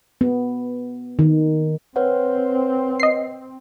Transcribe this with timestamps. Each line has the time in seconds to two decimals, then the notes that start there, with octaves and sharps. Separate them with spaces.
0.21 B3
1.19 D#3
1.96 C4 B4 C#5 F#5
3.00 D#5 C7